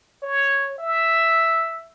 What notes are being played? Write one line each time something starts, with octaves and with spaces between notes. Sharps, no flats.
C#5
E5